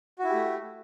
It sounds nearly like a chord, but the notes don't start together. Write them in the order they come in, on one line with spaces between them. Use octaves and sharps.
F#4 E4 G4 A3